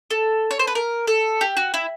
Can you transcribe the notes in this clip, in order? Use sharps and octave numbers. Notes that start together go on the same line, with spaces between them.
A4
C#5
C5
B4
A#4
A4
G4
F#4
E4